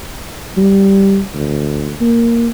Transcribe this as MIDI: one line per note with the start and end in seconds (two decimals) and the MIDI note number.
0.57 1.21 55
1.34 1.93 38
2.01 2.49 58